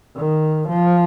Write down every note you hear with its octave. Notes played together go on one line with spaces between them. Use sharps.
D#3
F3